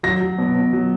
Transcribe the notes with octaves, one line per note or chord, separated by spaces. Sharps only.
F#3 A#6
F#3
B2
B2
F#3